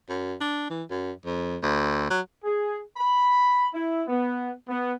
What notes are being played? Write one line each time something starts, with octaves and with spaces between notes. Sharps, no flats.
F#2
D4
E3
F#2
F2
D2
F#3
G#4
B5
E4
B3
B3